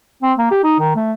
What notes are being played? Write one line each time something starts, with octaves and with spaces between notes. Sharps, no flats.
C4
A#3
G4
D#4
D#3
A3